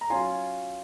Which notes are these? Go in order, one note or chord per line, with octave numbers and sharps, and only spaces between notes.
A#5
F#3 C#4 F4 G#5 C6